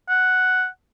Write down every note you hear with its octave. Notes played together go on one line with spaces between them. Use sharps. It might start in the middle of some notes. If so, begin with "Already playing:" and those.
F#5